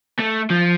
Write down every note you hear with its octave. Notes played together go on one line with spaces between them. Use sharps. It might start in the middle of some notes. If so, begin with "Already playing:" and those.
A3
F3